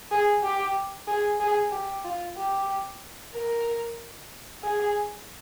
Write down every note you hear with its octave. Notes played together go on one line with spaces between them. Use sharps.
G#4
G4
G#4
G#4
G4
F4
G4
A#4
G#4